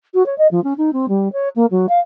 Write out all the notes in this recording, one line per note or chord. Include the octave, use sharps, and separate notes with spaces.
F#4
C#5
D#5
F3
C#4
D#4
C4
G3
C#5
A#3
F#3
F5